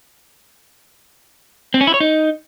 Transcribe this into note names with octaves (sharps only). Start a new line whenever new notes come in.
C4
C#4
E4
C#5
D#4